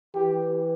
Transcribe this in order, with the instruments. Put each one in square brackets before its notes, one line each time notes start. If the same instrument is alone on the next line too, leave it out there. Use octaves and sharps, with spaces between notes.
[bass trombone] E3 [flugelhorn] G4